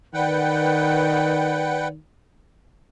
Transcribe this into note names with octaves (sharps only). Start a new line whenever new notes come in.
D#3 B4 D5 F#5 G5